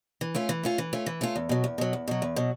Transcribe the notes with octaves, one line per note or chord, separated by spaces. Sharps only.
E3
A3 C#4 F4
E3
A3 C#4 F4
E3
A3 C#4 F4
E3
A3 C#4 F4
E2
B2 F#3
E2
B2 F#3
E2
B2 F#3
E2
B2 F#3